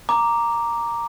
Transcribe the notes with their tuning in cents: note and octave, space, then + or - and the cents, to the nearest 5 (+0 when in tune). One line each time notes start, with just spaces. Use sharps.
A#5 +0 D6 +0